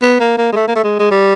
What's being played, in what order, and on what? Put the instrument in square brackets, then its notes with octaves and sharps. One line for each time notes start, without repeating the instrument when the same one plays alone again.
[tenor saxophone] B3
A#3
A#3
G#3
A3
A#3
A3
G#3
G#3
G3